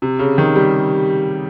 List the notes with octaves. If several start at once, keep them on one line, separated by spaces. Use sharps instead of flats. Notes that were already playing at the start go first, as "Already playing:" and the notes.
C3
C#3
D#3
G3